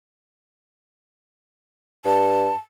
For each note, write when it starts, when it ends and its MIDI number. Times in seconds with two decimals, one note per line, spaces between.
2.05 2.50 43
2.05 2.57 81